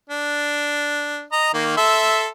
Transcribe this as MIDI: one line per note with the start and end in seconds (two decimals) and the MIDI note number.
0.09 1.24 62
1.32 1.52 75
1.32 1.52 82
1.54 1.74 51
1.54 1.74 58
1.77 2.27 69
1.77 2.27 76
1.77 2.27 84